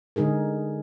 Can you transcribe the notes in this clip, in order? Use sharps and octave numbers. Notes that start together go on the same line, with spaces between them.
D3 G#3 D#4 G#4 A#4